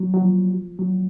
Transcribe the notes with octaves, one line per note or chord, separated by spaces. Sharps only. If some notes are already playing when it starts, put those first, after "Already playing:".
Already playing: F#3
F#3
F3
F#3